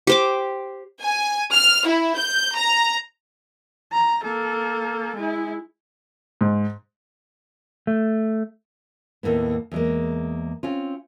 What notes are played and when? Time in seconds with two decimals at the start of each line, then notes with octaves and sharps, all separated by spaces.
0.07 G4 C5 D6
1.01 G#5
1.53 F6
1.86 E4
2.16 G6
2.54 A#5
3.92 A#5
4.23 A#3 A4
5.16 G#3 E4
6.41 G#2
7.87 A3
9.23 D#2 A2 A#3 B3
9.71 E2 G#3 A#3
10.63 C4 C#4 F4